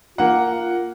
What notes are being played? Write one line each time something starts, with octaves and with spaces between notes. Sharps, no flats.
A#3 F4 F#5